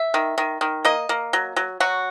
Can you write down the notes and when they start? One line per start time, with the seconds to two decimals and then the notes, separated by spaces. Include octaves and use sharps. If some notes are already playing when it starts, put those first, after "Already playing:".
Already playing: E5
0.14 D#3
0.38 D#3
0.61 D#3
0.85 A#3 D#5
1.09 A#3
1.33 F#3
1.56 F#3
1.80 F#3 F#4